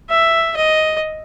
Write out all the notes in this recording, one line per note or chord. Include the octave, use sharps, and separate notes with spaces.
E5
D#5